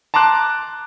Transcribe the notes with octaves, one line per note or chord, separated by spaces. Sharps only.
A5 A#5 C6 D6 F#6